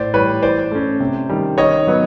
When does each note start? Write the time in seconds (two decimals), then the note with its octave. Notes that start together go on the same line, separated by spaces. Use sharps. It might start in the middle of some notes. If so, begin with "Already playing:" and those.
Already playing: A2 C5 D5
0.14 E3 G3 B4 C#5
0.42 E3 C5 D5
0.71 A3 C#4
1.00 C3
1.29 D#3 G3
1.58 D#3 C#5 D#5
1.87 F#3 B3